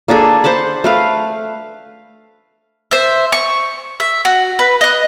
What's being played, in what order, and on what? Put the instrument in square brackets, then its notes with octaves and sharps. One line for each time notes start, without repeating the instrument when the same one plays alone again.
[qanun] A#3 D4 G#4 A4
C5 F#5 A5 B5
A3 B4 F5
[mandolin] C5 E5
C#6
E5
F#4
B4
D#5 F#6